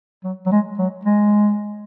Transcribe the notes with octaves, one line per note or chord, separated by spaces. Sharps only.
F#3
F#3
G#3
F#3
G#3